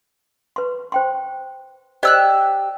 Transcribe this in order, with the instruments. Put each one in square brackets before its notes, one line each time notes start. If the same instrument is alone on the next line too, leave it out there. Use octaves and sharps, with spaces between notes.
[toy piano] B4 C6
C5 G5 C6
[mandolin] G4 E6 F#6 [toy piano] C5 D5 D#5